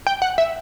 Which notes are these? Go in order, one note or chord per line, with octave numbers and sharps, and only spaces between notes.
G5
F#5
E5